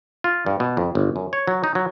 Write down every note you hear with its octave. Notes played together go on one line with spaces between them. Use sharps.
F4
G2
B2
F2
G1
F#2
C#5
F#3
D#4
F#3